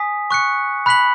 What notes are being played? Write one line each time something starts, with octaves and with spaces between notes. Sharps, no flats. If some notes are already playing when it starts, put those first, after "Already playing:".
Already playing: G#5 D#6 B6
C#6 F#6 C#7
B5 F#6 B6 F#7